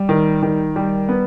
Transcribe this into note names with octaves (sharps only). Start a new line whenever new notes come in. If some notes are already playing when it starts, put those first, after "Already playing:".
Already playing: G3
D#3
D#3
G3
B3